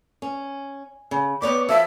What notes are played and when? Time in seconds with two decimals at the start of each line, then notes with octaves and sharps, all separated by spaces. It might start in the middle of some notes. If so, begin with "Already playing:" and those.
0.22 C#4
1.11 C#3
1.42 B3 C#5 D5 D6
1.69 F3 A4 E5